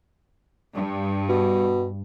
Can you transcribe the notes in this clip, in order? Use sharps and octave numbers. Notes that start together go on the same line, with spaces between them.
G2
B2